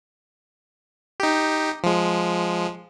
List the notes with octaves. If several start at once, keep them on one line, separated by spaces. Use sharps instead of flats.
D#4 G4
F3 G#3